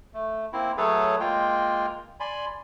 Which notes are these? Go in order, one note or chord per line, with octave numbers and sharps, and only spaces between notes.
A3
A#3 C4 E4
F#3 A3 G#4 A4 B4 C#5
G#3 A#3 F4 G5
D5 G#5 B5 C6